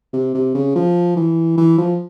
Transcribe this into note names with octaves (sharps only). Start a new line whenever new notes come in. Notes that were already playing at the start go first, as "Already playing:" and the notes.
C3
C3
C#3
F3
E3
E3
F3